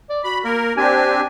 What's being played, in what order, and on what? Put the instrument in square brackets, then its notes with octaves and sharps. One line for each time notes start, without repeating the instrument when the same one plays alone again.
[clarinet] D5
[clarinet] F#4 [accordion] B5
[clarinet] A#3 [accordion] A#4
[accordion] C4 D4 G4 [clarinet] G#5